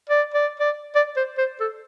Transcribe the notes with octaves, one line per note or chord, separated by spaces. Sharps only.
D5
D5
D5
D5
C5
C5
A4